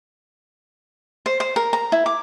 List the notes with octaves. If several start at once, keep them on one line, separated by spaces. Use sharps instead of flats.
C5
C5
A#4
A#5
E4
D6